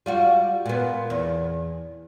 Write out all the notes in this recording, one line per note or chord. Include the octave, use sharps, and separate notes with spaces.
G3 F4 F#4
A#2 B3
E2